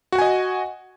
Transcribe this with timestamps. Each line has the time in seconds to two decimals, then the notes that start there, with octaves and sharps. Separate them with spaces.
0.12 F#4
0.15 F#5
0.18 G#5
0.21 D#5